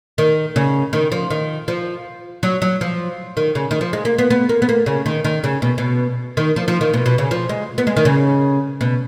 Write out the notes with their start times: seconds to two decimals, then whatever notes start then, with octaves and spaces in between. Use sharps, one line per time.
0.18 D#3
0.56 C#3
0.93 D#3
1.12 F3
1.31 D#3
1.68 F3
2.43 F#3
2.62 F#3
2.81 F3
3.37 D#3
3.55 C#3
3.71 D#3
3.81 F3
3.93 G#3
4.05 A#3
4.18 B3
4.30 B3
4.49 A#3
4.62 B3
4.69 A#3
4.86 C#3
5.06 D#3
5.24 D#3
5.44 C#3
5.62 B2
5.78 B2
6.37 D#3
6.56 F3
6.68 F3
6.81 D#3
6.94 B2
7.06 B2
7.18 C#3
7.31 F3
7.49 G#3
7.78 B3
7.87 G#3
7.97 D#3
8.05 C#3
8.81 B2